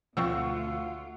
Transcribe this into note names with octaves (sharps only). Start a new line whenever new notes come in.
D2 B2 F3 C4 F4 F#5 C#6 E6